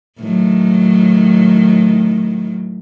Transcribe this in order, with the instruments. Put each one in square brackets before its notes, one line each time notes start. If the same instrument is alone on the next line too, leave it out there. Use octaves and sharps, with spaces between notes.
[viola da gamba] A2 D#3 F#3